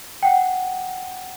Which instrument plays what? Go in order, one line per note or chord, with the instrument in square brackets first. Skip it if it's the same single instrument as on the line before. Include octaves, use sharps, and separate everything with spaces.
[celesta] F#5 G5